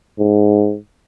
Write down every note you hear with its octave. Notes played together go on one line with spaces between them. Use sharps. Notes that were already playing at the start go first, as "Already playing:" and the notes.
G#2